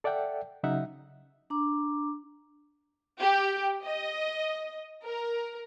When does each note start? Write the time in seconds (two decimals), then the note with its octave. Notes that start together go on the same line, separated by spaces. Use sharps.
0.04 A4 D5 E5 F#5 G5
0.63 C#3 F#3 D#4 E5 F#5
1.50 D4 A#5 D6
3.21 G4
3.85 D#5
5.04 A#4